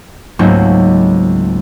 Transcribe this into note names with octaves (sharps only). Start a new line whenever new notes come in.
C#2 G#2 F#3 A3 A#3 C4